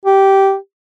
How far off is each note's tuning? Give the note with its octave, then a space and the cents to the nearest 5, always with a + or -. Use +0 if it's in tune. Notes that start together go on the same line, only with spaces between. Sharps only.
G4 -10